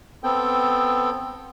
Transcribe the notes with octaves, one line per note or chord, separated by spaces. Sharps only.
B3 C4 A4 G5